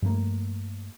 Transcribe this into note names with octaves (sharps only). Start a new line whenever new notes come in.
G2 F3 A3 A#3